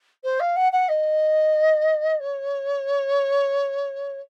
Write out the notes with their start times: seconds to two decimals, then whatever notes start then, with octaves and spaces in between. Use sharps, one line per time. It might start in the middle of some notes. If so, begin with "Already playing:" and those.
0.24 C5
0.40 F5
0.56 F#5
0.72 F#5
0.89 D#5
2.20 C#5